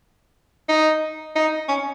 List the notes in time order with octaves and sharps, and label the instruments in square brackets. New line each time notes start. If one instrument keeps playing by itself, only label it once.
[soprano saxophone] D#4
D#4
C#4